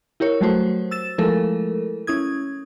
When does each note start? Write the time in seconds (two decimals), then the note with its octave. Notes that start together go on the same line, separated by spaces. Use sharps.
0.20 E4 G4 A#4 C#5
0.41 F#3 G3 A3 F#4 C5
0.91 E6 A6 E7
1.18 F3 G#3 A3 E4 A4 A#4
2.07 C#4 E4 D#6 G#6